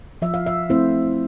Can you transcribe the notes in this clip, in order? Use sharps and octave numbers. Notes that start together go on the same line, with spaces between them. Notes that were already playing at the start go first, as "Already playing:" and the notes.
F3 E5
F5
E5
A3 C4 E4 C5